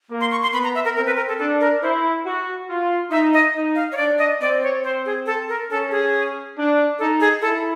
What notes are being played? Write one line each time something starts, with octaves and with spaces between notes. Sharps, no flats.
A#3
C6
C#6
C6
B3 B5
A#5
E5
A#4
C4 A#4
B4
A#4
A4
D4 A4
A#4
E4 C5
F#4
F4
D#4 E5
D#5
D#4
F5
C#5
D4 D5
D#5
C4 D5
C#5
C5
G#4
A4
A#4
C#4 A4
G#4
D4
D#4 A4
G#4
E4 A4